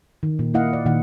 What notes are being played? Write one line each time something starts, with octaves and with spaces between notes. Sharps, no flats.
D#3
A#2
A#3 E4 D#5 F5 F#5
D5
A#2 D#3 F#5